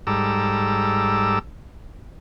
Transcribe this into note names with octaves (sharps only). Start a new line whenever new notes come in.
G#2 G3 A4 A#5 D6 E6